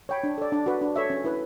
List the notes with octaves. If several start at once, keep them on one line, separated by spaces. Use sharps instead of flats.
C#5 G5 B5
D4
A4 D5
D4
F#4 B4
D4
A4 C#5 E5
C#4
E4 B4